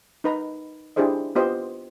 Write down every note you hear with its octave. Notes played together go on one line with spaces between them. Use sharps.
D#4 B4 A#5
D4 E4 G4 G#4 C5 D#5
B3 F4 G4 C5 D#5